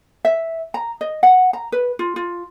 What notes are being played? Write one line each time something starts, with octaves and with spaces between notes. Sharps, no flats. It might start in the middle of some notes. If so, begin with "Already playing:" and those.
E5
A#5
D#5
F#5
A#5
B4
F4
F4